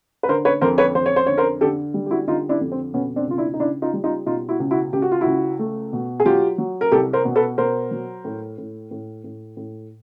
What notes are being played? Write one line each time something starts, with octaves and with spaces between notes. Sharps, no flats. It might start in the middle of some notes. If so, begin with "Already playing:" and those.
B4
D3 A#4 C5
B4 C#5
F2 A#4 C5
B4 C#5
F2 C5
C#5
C5
D3 C#5
A#4 C5
D3 G4 A4
G3
G4
E4 F#4
D3 D#4 F4
D4 E4
F2
C4
B2 B3 C#4
C4 D4
C#2 F4
D4 E4
D#4
C#2 D4 E4
D#4 F4
G3
D#4 F4
B2 D#4 F4
E4 F#4
C#2
E4 F#4
C#2 G4
F#4
F4
C#2 E4 F#4
A3
B2
G#4
F#3 F4 G4
F#3
A#4
C2 G4 A4
A#4 C5
B2
A4 B4
B2 A#4 C5
F#3
A2
A2
A2
A2
A2